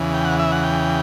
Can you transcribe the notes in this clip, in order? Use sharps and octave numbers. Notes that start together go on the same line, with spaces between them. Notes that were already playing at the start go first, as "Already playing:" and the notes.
Already playing: E2 C#3 E3
G5
F#5
E5
F#5
G5